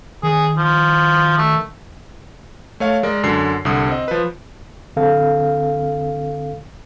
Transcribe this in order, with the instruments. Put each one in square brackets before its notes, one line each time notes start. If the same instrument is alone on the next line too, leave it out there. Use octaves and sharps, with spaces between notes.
[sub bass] D#3 [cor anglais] G#4
[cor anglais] F3
A3
[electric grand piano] A3 C#5 F5
G#3 A#4 D5
F#2 D3 C7
C2 D3 D#6
C4 D#5
F3 B4
[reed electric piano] D3 C4 A4 F5